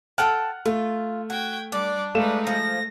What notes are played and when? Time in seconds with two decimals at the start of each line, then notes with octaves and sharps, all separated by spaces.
0.18 A4 F#5 G5 A5 F6 F#6
0.66 A3 F4
1.30 F#4 G5 G#6
1.72 G3 D4 D5
2.15 G#3 A3 D#4 B4 F5 E7
2.47 F3 A#6